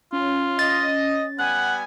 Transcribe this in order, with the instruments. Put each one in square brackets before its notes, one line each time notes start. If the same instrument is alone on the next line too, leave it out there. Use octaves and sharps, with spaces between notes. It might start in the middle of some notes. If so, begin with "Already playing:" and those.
[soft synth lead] C#4 [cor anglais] F4
[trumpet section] D#5 [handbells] A6
[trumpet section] G3 B3 G#5 [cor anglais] F#5